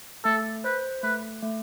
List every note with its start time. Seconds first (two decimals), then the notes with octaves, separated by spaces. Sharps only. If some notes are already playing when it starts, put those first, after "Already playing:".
0.25 A3 A4
0.64 B4 C5
1.03 A3 B4
1.43 A3